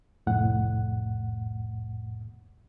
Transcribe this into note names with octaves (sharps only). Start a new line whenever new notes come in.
C2 F2 A2 F#5